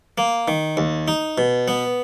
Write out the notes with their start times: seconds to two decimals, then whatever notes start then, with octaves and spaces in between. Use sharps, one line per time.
0.18 A#3
0.48 D#3
0.77 D#2
1.08 D#4
1.38 B2
1.68 B3